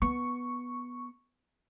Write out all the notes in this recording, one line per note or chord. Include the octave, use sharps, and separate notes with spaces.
B3 C#6